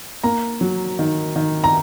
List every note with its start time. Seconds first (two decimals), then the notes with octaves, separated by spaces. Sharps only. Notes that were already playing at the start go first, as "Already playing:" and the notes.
0.24 A#3 A#5
0.61 F#3
0.99 D#3
1.36 D#3
1.64 A#5